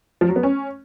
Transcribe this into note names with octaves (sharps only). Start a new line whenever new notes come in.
F3
F#3
B3
C#4